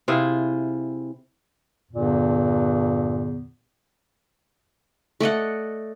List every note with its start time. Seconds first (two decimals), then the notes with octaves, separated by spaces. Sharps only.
0.08 C3 E4 F4 G#4
1.91 E2 G2 A#2 D3
5.20 A3 D5 D#5 F#5